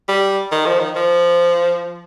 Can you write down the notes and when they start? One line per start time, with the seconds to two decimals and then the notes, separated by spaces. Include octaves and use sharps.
0.08 G3
0.52 D#3
0.66 F3
0.79 D#3
0.96 F3